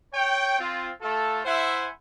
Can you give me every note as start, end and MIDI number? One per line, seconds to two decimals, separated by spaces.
0.13 0.56 73
0.13 0.56 79
0.59 0.91 60
0.59 0.91 65
1.02 1.40 57
1.02 1.40 65
1.02 1.40 69
1.45 1.89 64
1.45 1.89 72
1.45 1.89 76
1.45 1.89 78
1.45 1.89 80